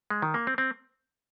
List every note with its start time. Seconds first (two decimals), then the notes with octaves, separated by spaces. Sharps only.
0.10 G#3
0.22 D#3
0.34 A#3
0.47 C4
0.58 C4